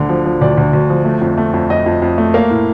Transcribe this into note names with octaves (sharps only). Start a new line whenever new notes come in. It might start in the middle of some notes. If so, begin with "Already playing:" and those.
Already playing: D2 D3
F3
F3
D2 D5
D2
D2
F3
A3
F2
A3
F2
F2 D#5
F2
F2
A3
A#3 F5
A2